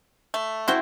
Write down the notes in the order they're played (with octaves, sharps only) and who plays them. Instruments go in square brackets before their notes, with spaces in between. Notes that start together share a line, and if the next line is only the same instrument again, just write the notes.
[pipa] A3
[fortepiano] E4 [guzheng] F#4 C5 G5